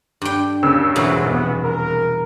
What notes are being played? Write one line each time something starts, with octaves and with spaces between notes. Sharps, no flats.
G2 G5
D#2 C#3 E6
E2 G#2 B2 E3 F#3 C4
F1 B3
A#4